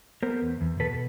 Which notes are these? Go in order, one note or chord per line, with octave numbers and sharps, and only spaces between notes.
B3 A#4 C5
E2
E2
B2 A4 B4